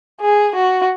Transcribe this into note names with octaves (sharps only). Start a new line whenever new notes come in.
G#4
F#4